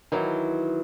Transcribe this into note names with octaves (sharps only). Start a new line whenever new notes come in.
D#3 E3 F#3